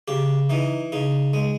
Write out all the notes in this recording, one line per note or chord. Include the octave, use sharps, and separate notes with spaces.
C#3 G4
E3 D#4
C#3 D#4
G#3